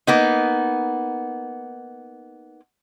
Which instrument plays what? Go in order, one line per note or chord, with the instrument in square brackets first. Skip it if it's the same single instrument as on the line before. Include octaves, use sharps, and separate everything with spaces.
[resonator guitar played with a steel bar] A#3 B3 D#4